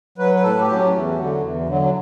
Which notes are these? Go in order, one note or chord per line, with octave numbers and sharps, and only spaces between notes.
F#3 B4
B4
A2 A4
G4
F#3
C#4
E2
D3 F#3
E2
D3 F#3
F#3